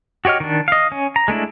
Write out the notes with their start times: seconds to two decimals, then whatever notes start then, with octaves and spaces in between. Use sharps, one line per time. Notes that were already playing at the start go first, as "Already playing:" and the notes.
0.25 F#4 G4 C#5 D#5 F6
0.40 D#3 D4
0.68 D#5 F5
0.92 C#4
1.16 A#5
1.28 G#3 A3 D4 E4